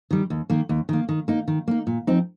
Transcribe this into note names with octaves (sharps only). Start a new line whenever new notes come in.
D#3 G3
D#2
D#3 A#3
D#2
D#3 A#3
D#3
A#3 D#4
D#3
A#3 D#4
A#2
F3 C4 D#4